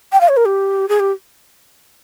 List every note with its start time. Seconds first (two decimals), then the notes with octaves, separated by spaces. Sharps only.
0.12 G5
0.21 F5
0.29 C#5
0.37 A#4
0.45 G4
0.89 G#4
1.00 G4